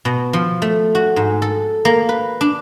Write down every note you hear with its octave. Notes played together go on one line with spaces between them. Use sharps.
B2
F3
A3
F#4
G#2
A4
A#3
B4
D4